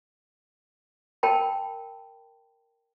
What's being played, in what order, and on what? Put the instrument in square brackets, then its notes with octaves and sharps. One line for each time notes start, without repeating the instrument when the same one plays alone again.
[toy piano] A#4 G5 A5 B5